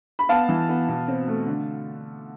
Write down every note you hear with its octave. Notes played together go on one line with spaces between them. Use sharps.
B5
B3 F5 A5
E3
B3
B2
C4
A3
D3